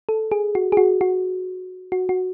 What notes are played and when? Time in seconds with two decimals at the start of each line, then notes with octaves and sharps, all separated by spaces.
0.09 A4
0.32 G#4
0.55 F#4
0.72 G#4
0.77 F#4
1.01 F#4
1.92 F#4
2.09 F#4